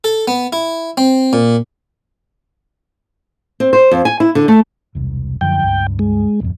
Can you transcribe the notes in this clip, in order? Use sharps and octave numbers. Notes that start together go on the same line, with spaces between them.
A4
B3
E4
C4
A#2
C4
C5
F2
G#5
E4
D3
A3
E1 C2
F#2 D3 F3 G5
C#2 G2
G#3
D1 F2